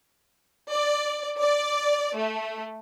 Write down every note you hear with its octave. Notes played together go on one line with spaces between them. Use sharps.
D5
D5
A3